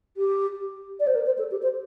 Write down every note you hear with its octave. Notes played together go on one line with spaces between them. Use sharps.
G4
D5
C5
A#4
C5
A4
G4
C5